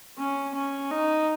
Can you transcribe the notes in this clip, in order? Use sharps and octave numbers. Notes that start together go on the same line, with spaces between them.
C#4
C#4
D#4